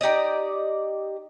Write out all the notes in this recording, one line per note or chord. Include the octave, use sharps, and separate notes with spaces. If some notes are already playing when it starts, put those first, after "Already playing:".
D#4 G4 D5 D#5